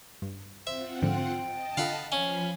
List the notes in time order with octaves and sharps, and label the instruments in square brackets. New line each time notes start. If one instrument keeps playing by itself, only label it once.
[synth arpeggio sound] G2
[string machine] C4 F4 F#5 [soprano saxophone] C5 [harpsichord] E5
[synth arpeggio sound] G#2 D3 F3 [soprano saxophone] G5
[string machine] D#5 A5
[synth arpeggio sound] D3 F4 A4 [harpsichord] F5 F#5 B5
[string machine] F3 F5 B5 [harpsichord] C#4 [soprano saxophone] G#5